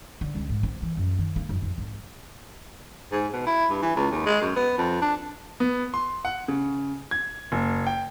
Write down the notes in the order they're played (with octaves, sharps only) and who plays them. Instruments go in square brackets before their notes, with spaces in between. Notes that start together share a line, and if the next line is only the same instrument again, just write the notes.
[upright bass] D3
C#2
G#2
C4
E3
F#2
D#3
A#3
F#2
F2
G#1
[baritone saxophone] G#2
B2
E4
G2
E3
C#2
D#2
G#3
F#2
B3
F2
D4
[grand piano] B3
C6
F#5
C#3
G#6
F#1
G5